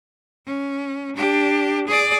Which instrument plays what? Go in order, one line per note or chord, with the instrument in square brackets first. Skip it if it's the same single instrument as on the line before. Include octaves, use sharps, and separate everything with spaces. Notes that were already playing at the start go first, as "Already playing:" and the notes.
[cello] C#4
D4 G4
G#4 D5